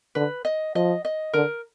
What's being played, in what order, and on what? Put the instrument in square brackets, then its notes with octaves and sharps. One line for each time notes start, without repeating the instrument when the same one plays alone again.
[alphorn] D3 [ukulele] B4
[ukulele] D#5
[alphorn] F3 [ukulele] D#5
[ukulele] D#5
[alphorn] D3 [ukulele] A#4